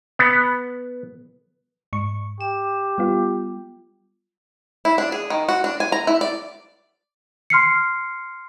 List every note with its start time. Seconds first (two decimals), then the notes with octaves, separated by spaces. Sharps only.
0.19 B3
1.93 G#2 C#6
2.41 G4 E7
2.98 G3 B3 F4
4.85 E4
4.98 D4
5.12 G#4
5.30 D#3
5.49 F#4
5.64 D4
5.80 G#5
5.92 A#5
6.07 E4
6.21 D5
7.50 C6 F6 C7 C#7